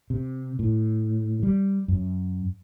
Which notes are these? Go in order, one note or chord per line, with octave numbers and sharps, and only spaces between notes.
C3
A2
G3
F#2